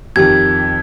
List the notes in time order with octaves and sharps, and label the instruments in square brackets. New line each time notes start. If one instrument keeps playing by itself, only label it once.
[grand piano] F2 D#3 [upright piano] G4 [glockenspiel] G#6